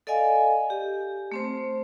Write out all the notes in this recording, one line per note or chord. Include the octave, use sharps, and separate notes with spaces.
A4 D5 D#5 F5 G#5
G4
A3 C4 C5